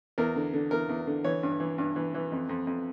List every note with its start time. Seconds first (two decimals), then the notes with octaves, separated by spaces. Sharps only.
0.18 E2 A#4
0.36 D3
0.53 D3
0.71 E2 A#4
0.89 E2
1.07 D3
1.24 E3 C#5
1.43 G2
1.60 E3
1.78 G2
1.96 E3
2.14 E3
2.32 F2
2.49 F2
2.67 F2